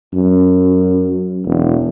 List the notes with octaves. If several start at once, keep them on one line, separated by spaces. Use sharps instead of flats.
F#2
E1